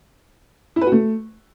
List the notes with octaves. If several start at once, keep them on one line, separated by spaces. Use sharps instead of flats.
E4
B4
F#4
A3